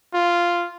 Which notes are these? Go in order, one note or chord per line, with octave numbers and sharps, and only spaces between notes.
F4